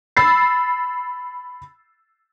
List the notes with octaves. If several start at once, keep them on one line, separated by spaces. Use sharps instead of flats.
B5 E6 A6 C7